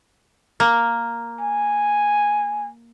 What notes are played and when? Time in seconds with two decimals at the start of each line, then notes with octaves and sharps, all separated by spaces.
0.60 A#3
1.41 G#5